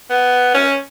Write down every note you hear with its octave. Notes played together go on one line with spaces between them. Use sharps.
B3
C#4